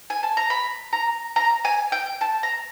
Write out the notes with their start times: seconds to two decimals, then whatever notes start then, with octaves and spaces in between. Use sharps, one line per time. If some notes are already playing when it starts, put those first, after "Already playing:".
0.10 G#5
0.23 A5
0.37 A#5
0.50 B5
0.93 A#5
1.36 A#5
1.65 G#5
1.92 G5
2.21 A5
2.43 A#5